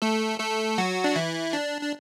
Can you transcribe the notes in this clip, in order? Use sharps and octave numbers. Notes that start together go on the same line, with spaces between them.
A3 A4
A3 A4
F#3 F#4
D4
E3 E4
D4
D4